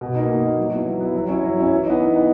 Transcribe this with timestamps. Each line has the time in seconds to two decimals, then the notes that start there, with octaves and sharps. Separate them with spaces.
0.01 B2
0.15 A#3 D#4
0.29 B2
0.43 A#3 D#4
0.57 F#3
0.72 B3 E4
0.86 F#3
1.00 B3 E4
1.14 F#3
1.28 C#4 E4
1.43 F#3
1.57 C#4 E4
1.71 E3
1.85 B3 D#4
1.99 E3
2.13 B3 D#4